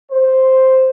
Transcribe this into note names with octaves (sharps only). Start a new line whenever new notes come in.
C5